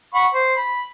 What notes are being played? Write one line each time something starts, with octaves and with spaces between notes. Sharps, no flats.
F#5 B5 C#6
C5
B5